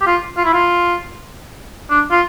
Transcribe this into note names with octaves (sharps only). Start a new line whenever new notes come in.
G4
F4
F4
E4
F4
D4
F4